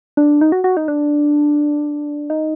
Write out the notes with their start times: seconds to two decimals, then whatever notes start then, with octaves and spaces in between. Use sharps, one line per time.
0.17 D4
0.41 D#4
0.52 F#4
0.64 F#4
0.77 D#4
0.88 D4
2.30 D#4